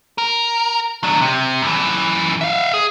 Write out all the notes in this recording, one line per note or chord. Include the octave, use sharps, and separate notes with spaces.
A#4
F#3 D4
C3
F#2 E3
E5 F5
G#4